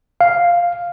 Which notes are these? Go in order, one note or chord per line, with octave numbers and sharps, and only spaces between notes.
F5